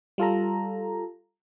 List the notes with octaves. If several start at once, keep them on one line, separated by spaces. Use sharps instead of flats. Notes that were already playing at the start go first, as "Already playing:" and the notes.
G3 F4 A4 A#5